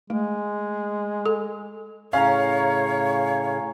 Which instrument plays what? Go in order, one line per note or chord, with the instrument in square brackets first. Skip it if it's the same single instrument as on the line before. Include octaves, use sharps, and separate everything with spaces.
[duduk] G#3 [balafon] A3
[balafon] A4
[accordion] A2 C#3 [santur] C#4 A#5 [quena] C#5 [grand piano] F5